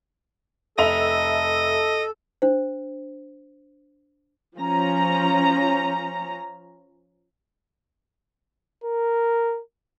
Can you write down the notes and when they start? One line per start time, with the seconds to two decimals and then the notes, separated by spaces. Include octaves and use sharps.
0.78 F1 A4 D#5 E5 F7
2.42 D4 C5
4.57 F3 C#4 A#5
8.84 A#4